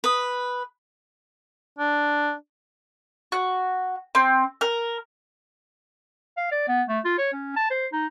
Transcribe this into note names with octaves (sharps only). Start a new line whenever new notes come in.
B4 D#6
D4
F#4
C4
A#4
F5
D5
B3
A3
F4
C#5
C#4
A5
C5
D#4